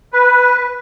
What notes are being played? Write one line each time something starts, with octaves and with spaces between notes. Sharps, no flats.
B4